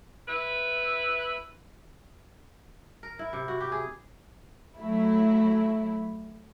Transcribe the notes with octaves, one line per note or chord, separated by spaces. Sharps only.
E4 B4
A#4
E4
C3
F#4
G4
G#4
F#3 A3 E4